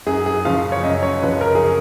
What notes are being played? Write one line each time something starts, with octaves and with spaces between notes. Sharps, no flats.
F#2 G#4
G#4
C#3 F3 F5
C#5
F#2 D#5
C#5
C#3 F3 B4
A#4
G#4